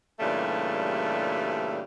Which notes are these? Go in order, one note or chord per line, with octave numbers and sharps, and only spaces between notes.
G2 A#2 C#3 E3 G3 A3